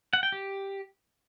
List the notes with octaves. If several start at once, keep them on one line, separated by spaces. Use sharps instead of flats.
F#5
G5
G4